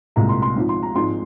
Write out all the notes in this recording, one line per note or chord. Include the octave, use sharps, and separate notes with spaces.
C2 A#2 G#3 A#5
C6
C6
G#1 G#2 F3
C6
A#5
G#1 G#2 F3 G#3 C6